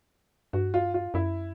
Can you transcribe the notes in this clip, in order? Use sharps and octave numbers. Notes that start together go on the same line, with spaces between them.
G2 F#4
F4
F4
F#2 E4